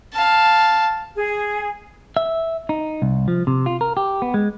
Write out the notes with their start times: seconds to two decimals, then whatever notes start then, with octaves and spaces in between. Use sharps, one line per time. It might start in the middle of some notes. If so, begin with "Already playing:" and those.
0.13 F5 A5
1.16 G#4
2.17 E5
2.69 D#4
3.02 C2
3.28 F3
3.47 C3
3.66 F4
3.81 A#4
3.97 G4
4.22 B3
4.34 G#3